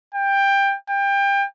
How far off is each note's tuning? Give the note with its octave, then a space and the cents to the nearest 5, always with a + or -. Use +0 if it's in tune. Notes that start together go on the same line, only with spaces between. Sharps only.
G5 +15
G5 +25